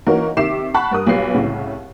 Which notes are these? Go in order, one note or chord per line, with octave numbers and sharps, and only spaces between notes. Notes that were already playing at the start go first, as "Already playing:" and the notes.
E3 A#3 C#4 D#4 F#4 A#4
C3 D#3 E5 D6 C7 E7
F#5 A5 B5 C#6 F#6
G2 A#4 D#6
B1 G3 F4 B4 C7
C2 A2 C#3